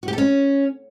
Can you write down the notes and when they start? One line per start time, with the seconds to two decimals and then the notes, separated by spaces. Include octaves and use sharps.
0.03 F#4
0.08 G4
0.13 A4
0.18 C#4